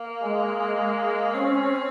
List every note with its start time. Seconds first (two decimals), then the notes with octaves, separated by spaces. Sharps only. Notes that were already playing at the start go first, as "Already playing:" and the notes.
Already playing: A#3
0.21 G#3
1.34 C4 C#4